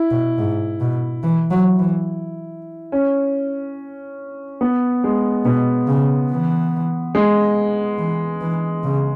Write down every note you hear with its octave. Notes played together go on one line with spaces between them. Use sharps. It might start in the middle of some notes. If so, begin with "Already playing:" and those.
Already playing: E4
B2
G#2
B2
E3
F#3
E3
C#4
B3
G#3
B2 B3
C#3
E3
G#3
E3
E3
C#3